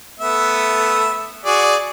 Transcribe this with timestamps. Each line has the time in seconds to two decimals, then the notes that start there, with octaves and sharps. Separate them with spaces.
0.19 A3 B3 E5
1.46 F#4 G#4 D5